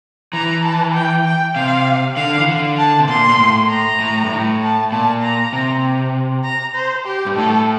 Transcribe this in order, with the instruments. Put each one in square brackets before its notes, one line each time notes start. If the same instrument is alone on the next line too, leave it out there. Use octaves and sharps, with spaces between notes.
[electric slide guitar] E3 [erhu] A#5
[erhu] A5
G5
G5
[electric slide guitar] C3 [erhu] F5
[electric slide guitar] D3 [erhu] F5
[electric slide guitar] E3
D3
[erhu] A5
[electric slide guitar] C3
[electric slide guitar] A#2 [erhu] C6
[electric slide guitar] A#2
A2
[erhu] A#5
[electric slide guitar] A2
G2
A2
[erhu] A5
[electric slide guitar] A#2 [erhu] A5
[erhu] A#5
[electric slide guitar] C3
[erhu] A#5
C5
G4
[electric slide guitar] G2
[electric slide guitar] A2 [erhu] A4